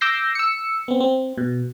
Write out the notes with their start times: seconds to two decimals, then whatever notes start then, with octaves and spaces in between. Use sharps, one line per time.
0.01 D6 E6 G6 A#6 C7
0.35 E6 C#7
0.88 B3 C4
1.00 C4
1.38 B2